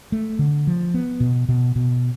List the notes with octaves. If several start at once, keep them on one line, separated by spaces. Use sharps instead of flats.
A3
D3
F3
B3
B2
B2
B2